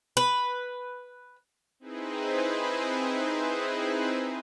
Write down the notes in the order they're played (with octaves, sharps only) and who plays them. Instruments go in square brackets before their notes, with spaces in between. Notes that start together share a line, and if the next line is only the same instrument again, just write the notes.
[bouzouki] B4
[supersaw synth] C4 D#4 E4 G#4 B4 C5